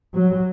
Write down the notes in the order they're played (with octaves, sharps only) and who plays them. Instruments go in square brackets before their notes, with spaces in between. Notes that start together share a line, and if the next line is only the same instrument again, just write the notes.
[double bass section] F#3